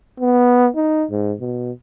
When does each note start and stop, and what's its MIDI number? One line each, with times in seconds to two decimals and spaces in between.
0.20 0.68 59
0.76 1.05 63
1.11 1.33 44
1.41 1.72 47